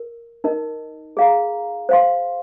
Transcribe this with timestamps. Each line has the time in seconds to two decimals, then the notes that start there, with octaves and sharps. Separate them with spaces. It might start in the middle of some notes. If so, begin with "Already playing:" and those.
Already playing: A#4
0.44 D#4 A#4 D#5
1.17 G#4 F5 A#5
1.89 C5 F5 C6